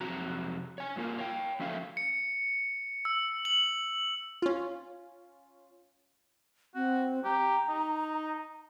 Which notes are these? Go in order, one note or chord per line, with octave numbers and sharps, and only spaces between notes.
F2 C3 F#3 F#4 A#5
C#5 G#5
G2 A#3 F4 A#4 G#5
C#5 F5 G5
F3 F#3 A3 C#4 E5 F5
C#7
E6
F#7
C#4 F4
C4 F#4
G4 A#5
D#4